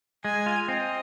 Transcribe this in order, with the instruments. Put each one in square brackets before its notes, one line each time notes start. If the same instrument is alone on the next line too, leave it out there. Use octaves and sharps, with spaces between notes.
[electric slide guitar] G#3 [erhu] G#5
[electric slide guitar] F4
[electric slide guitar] C4 [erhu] D#5